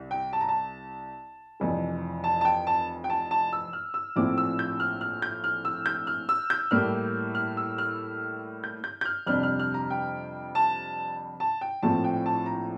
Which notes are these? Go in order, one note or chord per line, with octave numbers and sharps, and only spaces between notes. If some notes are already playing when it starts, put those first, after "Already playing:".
Already playing: C2
G5
A5
A#5
A5
F1 F2 E3
A5
A5
G5
A5
G5
A5
A5
E6
F6
E6
A#1 A2 F3 C4 E4 D6
E6
G6
F6
F6
G6
F6
E6
G6
F6
E6
G6
A2 G3 A#3 F6
F6
E6
F6
G6
G6
G6
F6
F2 C3 G3 D4 F6
F6
F6
A#5
G5
A5
A5
G5
A#1 A2 F3 C4 A5
G5
A5
A#5